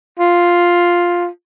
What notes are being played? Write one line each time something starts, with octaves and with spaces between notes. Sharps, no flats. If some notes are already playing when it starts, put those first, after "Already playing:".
F4